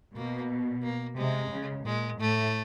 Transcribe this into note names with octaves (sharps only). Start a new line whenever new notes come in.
B2 A#3
A#3
C3 G#3
C#3
A#2 G#3
A2 A3